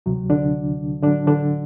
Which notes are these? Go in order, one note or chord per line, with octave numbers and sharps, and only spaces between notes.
D2 C3 F#3
D3 D4
A2 D3 F#3 D4
D3 D4